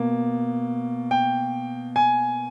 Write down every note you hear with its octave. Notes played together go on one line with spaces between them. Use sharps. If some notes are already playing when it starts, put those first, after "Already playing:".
Already playing: B2 A#3
G5
G#5